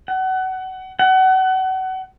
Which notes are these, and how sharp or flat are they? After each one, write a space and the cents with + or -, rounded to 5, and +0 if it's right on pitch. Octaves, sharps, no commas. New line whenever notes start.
F#5 +25
F#5 +30